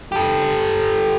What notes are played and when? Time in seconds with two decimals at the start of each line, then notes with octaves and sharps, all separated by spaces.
0.12 G4 A4